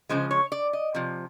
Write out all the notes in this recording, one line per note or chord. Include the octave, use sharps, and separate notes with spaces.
C#3 F3 G#3 C5
C#5
D5
D#5
C3 F3